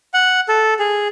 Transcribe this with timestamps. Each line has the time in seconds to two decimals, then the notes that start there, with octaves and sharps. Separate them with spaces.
0.14 F#5
0.48 A4
0.79 G#4